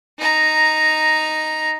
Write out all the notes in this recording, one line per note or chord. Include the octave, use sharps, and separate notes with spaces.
D#4 A#5